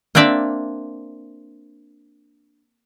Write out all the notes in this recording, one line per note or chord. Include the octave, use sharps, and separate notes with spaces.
A#3 C4 D4 D5 E5